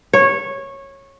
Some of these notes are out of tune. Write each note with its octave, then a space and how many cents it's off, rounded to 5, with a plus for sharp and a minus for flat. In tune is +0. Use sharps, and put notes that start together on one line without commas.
C#5 -15